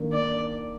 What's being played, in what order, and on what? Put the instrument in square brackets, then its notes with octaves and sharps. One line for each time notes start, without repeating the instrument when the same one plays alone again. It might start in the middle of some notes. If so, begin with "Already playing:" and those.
Already playing: [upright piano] D#3 A#3 D4
[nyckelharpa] D5